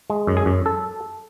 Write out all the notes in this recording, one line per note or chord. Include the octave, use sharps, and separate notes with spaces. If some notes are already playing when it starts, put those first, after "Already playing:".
G#3
F#2
G#4
F#2
A4